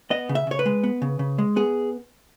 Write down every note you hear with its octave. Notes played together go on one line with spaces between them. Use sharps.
B3 D#5
C#3
E5
C#3 C#5
B4
G#3
B3
C#3
C#3
G#3
B3 G#4